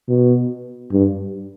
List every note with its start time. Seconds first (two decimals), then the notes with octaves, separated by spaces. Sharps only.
0.09 B2
0.92 G2